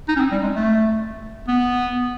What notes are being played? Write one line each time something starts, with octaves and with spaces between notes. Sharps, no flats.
D#4
C#4
C4
G3
G#3
A3
B3